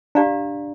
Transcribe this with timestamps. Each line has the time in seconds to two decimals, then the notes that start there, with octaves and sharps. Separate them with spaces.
0.15 D4 G4 D5 F5 A#5